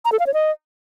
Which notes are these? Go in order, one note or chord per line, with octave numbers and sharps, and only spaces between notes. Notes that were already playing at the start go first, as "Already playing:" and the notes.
A#5
A4
F5
C#5
D#5